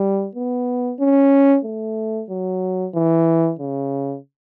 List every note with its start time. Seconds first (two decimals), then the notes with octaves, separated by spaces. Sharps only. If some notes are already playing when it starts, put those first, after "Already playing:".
Already playing: G3
0.35 B3
1.00 C#4
1.65 A3
2.30 F#3
2.95 E3
3.59 C#3